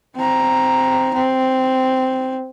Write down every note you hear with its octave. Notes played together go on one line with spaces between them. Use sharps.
C4 A#5
C4